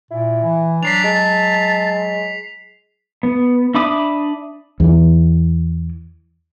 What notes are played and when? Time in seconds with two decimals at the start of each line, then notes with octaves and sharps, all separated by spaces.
0.11 A#2 E4
0.44 E3
0.83 F#3 D4 B6 C7 F7
1.04 G#3 A5
3.23 B3
3.74 D4 E5 B5 D6 D#6
4.80 E2 E3